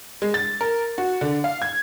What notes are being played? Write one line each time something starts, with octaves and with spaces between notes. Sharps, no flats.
G#3
A6
A#4
F#4
D3
F5
G#6